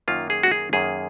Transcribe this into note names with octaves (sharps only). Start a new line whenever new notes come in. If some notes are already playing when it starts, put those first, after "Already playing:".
F#2 D#3 A#3 F4
G#4
F#4
G#4
F#2 D#3 A#3 G#4